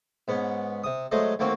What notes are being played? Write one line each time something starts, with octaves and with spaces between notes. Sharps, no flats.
G#2 B3 C#4
C3 D#6
F#3 G#3 A3 C5 D#5
D#2 A3 A#3 C4 F#4